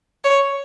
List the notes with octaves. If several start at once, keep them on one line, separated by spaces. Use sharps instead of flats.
C#5